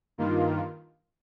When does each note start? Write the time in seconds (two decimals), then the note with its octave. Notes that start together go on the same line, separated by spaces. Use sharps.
0.18 G2 D#3 A#3 F4